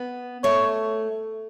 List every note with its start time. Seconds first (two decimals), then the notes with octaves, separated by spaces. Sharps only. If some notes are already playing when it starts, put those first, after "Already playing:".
Already playing: B3
0.44 A3 C#5